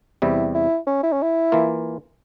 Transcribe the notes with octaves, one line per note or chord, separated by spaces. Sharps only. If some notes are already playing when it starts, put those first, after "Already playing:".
E2 C3 G3 E4
E4
C#4
E4
C#4
E4
E3 A#3 F4